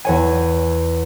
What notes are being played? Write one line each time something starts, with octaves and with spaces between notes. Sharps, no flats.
E2 C#5 G#5